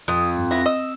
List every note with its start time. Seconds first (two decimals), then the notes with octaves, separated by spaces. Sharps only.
0.08 F2 D#6
0.37 G2
0.51 B3 E4 A#6
0.66 D#5 E6